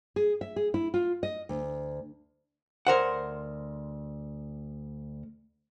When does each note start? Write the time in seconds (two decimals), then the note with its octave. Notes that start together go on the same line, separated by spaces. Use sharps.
0.16 G#4
0.41 E5
0.56 G#4
0.74 E4
0.94 F4
1.23 D#5
1.49 D2
2.87 D2 A#4 C5 F#5